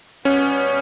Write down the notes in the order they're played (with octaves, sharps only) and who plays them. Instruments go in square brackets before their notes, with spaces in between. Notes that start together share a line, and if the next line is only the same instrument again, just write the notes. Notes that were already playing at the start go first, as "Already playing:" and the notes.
[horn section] B2 G3 B3 [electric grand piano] C#4